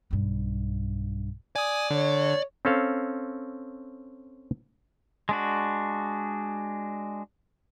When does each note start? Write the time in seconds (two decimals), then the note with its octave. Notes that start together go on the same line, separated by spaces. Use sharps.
0.11 B1 G2
1.56 D5 G#5 D#6
1.90 D3 C#5
2.65 C4 C#4 A4 F5
5.29 G#3 D4 F#4